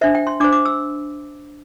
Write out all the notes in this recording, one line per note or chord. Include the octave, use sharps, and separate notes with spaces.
D4 C5 E5
G5
C6
D4 C5 D6
D6
E6